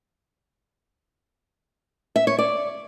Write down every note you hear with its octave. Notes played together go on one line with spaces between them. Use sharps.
E5
C#5
D5